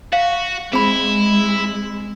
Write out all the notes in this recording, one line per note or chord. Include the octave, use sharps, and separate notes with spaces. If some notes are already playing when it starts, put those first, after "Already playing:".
F#4 F5
G#3 C4 E4 G#4 B5